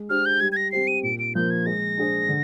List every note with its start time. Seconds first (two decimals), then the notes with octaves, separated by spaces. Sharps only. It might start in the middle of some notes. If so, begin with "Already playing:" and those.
Already playing: G#3
0.09 D4 G4 C5 F6
0.26 G6
0.40 G3 G#6
0.52 G#6
0.56 A#6
0.72 C4 G4 C5 C7
0.87 D#7
1.03 A#2 D7
1.19 D7
1.35 F3 A#3 G6
1.50 G#6
1.66 G#3 A#6
1.97 D4 G#4 C5
2.28 D3